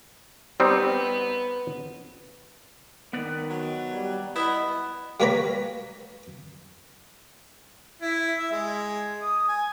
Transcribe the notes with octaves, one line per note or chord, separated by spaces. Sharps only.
G3 B3 C4 D#4
D#3 B3 B4 D5
F#3
G3
B3 E4 D#5
G3 A#3 B4 C#5 A#5 B5
E4
E5
G#3
D#6
G#5